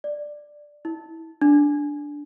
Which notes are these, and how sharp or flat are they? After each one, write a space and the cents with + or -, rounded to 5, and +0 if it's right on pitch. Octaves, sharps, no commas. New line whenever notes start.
D5 +10
E4 -25
D4 -5